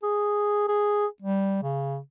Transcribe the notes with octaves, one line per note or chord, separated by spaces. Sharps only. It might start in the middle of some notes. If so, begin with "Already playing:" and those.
G#4
G#4
G3
C#3